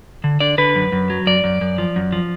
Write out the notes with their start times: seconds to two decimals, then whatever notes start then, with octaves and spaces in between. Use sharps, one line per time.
0.24 D3
0.40 D3 D5
0.58 D3 B4
0.75 F#2
0.92 F#2
1.10 F#3
1.27 F#2 D5
1.44 F#2
1.61 F#2
1.78 F3
1.96 F#2
2.12 F3